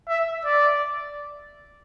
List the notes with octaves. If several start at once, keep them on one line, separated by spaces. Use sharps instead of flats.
E5
D5